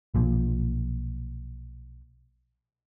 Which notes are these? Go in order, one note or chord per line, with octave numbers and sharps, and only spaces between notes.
B1 A#2 F3